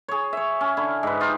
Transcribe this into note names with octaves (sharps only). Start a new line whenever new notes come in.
G#4 C#5
C#5 E5
C#4
D3 E4
G#2 B4
D#4 F4 G4